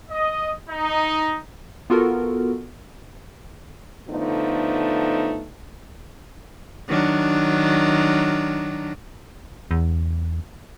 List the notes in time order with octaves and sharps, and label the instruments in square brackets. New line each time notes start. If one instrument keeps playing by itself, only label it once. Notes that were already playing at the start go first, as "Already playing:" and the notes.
[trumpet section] D#5
D#4
[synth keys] B3 F4 F#4 A4 A#4
[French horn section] D3 F3 A3 B3 D#4
[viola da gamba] D#3 F#3 D4
[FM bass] E2